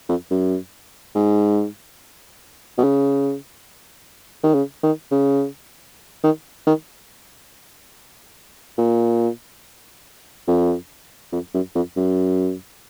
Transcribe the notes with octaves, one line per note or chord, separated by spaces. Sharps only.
F2
F#2
G#2
B2
C#3
D#3
C#3
D#3
C#3
D#3
D#3
A#2
F2
F2
F#2
F2
F#2